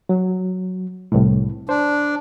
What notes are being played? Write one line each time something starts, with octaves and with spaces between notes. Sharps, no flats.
F#3
C2 A2
D4 C5